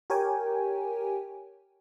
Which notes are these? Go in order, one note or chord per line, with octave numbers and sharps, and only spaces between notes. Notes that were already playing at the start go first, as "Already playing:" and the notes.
G4 A#4 C#5 G5 G#5